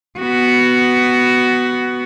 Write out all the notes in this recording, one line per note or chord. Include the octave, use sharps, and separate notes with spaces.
B3 F#4